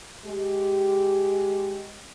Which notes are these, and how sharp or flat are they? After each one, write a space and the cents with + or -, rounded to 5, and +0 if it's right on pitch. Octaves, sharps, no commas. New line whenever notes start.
G#3 +0 G4 -10